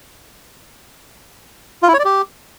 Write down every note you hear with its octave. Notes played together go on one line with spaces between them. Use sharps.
F4
E4
C#5
D5
G4